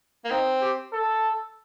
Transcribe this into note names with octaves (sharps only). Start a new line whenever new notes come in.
A#3
C4 D#4
G4
A4